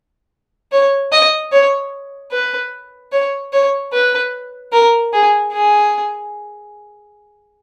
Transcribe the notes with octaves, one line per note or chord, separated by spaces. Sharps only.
C#5
D#5
C#5
B4
C#5
C#5
B4
A#4
G#4
G#4